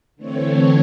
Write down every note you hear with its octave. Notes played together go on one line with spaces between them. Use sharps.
D3 E3 A3 C4 C#5